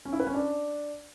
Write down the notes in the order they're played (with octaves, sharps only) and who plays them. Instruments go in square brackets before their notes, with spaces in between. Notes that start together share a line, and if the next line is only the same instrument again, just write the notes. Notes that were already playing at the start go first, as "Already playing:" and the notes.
[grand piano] C#4
E4
B4
C#4
D4